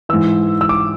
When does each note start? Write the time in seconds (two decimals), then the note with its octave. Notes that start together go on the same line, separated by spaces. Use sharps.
0.09 G#2 E3 E6
0.61 E6
0.69 D6